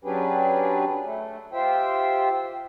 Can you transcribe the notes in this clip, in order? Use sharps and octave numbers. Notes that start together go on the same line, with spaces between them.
F#3 C#4 D4 G4 G#4 B4
A3
F4 G4 C5 E5 G5